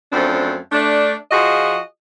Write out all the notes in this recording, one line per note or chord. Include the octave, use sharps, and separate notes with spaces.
F#2 F3 A3 C4 D4
A3 D4
F3 F4 F#4 G#4 D#5